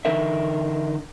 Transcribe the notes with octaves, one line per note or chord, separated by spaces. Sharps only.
D3 E3 D#4 A#4 E5